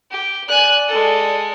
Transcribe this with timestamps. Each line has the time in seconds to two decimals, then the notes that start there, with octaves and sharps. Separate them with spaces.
0.11 G4
0.49 D5 G#5 F#6
0.88 G#3 A4